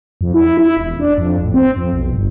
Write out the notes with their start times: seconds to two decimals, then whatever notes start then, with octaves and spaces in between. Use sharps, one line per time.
0.21 F2
0.34 E4
0.57 E4
0.77 E1
1.00 D4
1.18 F2
1.42 A1
1.54 C4
1.76 F2
1.93 B1
2.13 G1